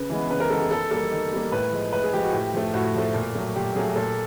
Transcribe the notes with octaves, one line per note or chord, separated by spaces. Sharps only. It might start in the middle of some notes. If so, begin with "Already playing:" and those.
Already playing: C#3 B4
E3 G#3 B3
C#3 B4
A#4
E3 G#3 B3 A4
G#4
D#3 A4
G3 A#3 A4
D#3
G3 A#3
A2 B4
F3 G#3
A2 B4
G#4
F3 G#3 G4
F#4
A2 G4
F3 A3
A2 F#4
F3 A3
A#2
F#3 A3
A#2 G4
F#3 A3 G#4
A#2 A4